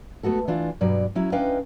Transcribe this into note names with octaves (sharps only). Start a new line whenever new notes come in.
A3 B3 F#4 A4
E3 D4 F4
G2 B2 F#3 D5
F#3 C#4 E4
C#4 D4 B4 D#5 F5 G5